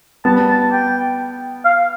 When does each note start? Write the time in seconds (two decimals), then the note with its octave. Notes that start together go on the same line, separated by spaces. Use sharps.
0.25 G3 B3 A5
0.49 A5
0.72 G5
1.65 F5